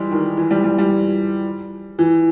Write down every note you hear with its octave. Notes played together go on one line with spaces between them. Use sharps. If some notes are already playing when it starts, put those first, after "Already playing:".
Already playing: E3 G3 G#3
D#3
E3
G3
G3
G3
E3